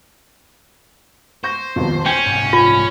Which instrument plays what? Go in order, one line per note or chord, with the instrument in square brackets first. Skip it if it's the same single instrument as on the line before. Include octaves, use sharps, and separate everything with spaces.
[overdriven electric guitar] C5 [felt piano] C#6 G6 A#6
[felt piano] D#1 B1 F2
[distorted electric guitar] C#4 [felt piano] G5 G6
[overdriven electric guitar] C2 G#2
[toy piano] F4